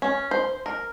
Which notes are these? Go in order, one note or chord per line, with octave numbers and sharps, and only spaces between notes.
C#4
C5
A#4